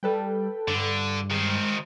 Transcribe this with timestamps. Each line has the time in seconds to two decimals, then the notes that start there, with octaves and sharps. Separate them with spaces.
0.03 G3 A4 B4 G5
0.68 G2 D3
1.31 D#3 G#3 C4